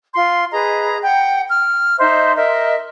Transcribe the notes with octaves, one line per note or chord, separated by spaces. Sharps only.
F4 C6
G#4 B4 D#5 A#5
F#5 G5
F6
D#4 C5 D#5 E5
A#4 D#5 E5